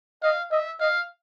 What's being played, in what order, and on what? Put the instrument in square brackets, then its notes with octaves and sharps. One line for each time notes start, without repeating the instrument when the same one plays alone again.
[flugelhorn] D#5 [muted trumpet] F5
[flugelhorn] D#5 [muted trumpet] E5
[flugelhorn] D#5 [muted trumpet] F5